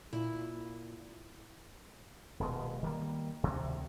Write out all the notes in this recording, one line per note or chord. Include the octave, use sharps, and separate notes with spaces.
A#2 E4
D#1 B2 G#3
D#3 G3 A#3
D2 G2 C3 D#3